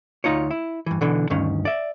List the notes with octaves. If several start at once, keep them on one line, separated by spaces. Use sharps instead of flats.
D2 D#4 F4 C#5
E4
G2 E3
B2 D3 E3
D2 G2 D#3 C#4
D5 E5